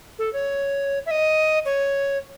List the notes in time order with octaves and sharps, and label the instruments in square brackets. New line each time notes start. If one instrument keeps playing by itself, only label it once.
[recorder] A4
C#5
E5
D#5
C#5